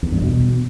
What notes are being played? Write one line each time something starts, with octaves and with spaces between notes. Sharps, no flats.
E2
G2
B2